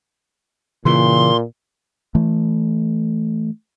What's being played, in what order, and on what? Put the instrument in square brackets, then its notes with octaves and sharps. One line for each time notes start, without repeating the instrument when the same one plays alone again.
[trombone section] A#2 [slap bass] C#3 E3 [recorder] C6
[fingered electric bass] E3 A3